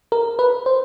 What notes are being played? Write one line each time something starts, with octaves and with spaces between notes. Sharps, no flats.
A#4
B4
C5